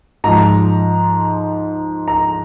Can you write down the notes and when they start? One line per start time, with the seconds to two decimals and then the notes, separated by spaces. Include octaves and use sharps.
0.24 G#2 F3 A#5
2.08 A#5